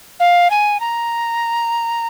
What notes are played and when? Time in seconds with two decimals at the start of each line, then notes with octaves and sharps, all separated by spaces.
0.19 F5
0.50 G#5
0.80 A#5